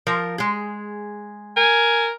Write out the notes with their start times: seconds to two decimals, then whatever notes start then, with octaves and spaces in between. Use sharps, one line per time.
0.07 F3 A#4
0.38 G#3 G#4
1.57 A#4 G#5